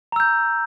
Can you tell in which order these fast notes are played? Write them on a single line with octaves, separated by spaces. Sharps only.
A#5 E6 G6